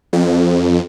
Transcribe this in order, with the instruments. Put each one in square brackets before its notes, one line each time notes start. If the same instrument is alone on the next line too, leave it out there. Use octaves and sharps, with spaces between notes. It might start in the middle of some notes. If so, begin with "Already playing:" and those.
[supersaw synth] F2